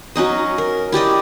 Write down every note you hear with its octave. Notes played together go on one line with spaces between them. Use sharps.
F#3 C#4 D#4 D#5
A#4
E4 G4 D5 D#5